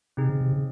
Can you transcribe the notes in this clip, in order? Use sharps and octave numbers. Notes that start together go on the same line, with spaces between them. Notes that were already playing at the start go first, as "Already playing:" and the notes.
C3 C4 D#4 G#4
C#3
C3
C#3